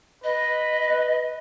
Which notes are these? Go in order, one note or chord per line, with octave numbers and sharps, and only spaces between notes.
B4 D#5